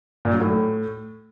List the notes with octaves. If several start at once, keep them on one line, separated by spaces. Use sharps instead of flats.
A#2
F#3
A2